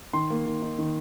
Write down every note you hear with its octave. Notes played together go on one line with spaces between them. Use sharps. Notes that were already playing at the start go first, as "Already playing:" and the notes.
D#3 C6
A#3
D#3
D#4
D#3